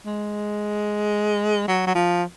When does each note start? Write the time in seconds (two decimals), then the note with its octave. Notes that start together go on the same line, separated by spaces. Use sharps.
0.06 G#3
1.68 F#3
1.87 F#3
1.95 F3